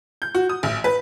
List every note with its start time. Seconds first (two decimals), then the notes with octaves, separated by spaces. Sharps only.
0.22 G6
0.35 F#4
0.49 D#6
0.63 A1
0.84 B4